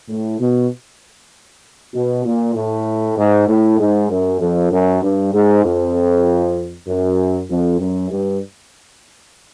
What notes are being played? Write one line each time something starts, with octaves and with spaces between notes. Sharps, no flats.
A2
B2
B2
A#2
A2
G#2
A2
G#2
F#2
F2
F#2
G2
G#2
F2
F#2
F2
F#2
G2